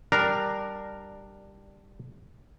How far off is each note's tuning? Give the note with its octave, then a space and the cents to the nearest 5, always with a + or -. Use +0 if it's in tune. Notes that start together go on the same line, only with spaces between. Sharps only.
G3 +0 D4 +15 A#4 +0